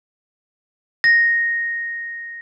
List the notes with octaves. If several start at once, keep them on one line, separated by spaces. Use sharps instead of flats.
A#6